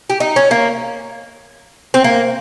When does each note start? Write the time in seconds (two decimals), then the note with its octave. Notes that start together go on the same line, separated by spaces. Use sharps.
0.10 G4
0.20 D#4
0.36 C#4
0.51 A#3
1.94 C4
2.04 A#3